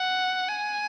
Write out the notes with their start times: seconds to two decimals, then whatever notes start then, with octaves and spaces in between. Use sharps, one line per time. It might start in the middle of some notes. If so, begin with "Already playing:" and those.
Already playing: F#5
0.48 G#5